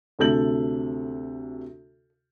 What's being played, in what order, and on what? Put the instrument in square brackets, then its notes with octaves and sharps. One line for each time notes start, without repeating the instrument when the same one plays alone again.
[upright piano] D2 C3 A4 G6 F#7